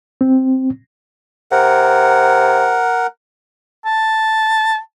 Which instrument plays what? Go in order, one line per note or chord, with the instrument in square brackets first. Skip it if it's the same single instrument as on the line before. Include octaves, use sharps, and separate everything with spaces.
[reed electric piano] C4
[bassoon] C3 [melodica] A#4 F#5
[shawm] A5